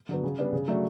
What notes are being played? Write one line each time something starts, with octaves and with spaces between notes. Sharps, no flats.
D3 F#3 B3
C#3
G3 B3 D4
C#3
F#3 A3 D4